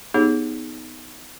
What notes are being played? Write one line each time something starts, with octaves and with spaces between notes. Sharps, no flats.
B3 D#4 G4 G#4 C#5